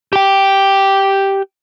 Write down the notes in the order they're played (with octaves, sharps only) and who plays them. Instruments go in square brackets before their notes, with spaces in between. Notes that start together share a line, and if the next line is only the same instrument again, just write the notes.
[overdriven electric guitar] G4 G5